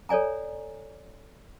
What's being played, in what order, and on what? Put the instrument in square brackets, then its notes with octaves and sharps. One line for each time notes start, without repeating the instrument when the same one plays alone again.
[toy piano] A4 C#5 D5 G#5 A#5